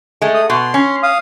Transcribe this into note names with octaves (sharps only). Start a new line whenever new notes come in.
G#3 A3
D#6
B2 C6
C#4
F5 D#6